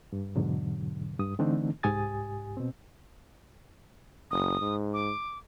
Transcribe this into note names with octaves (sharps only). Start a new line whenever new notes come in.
G2
E2 G#2 B2 D3 F#3
G2 D#6
D3 E3 A3 C4 D4 D#4
C2 G#2 G4 G#5 D#6 A6
B2 C4
F#1 D#6
G#2
D6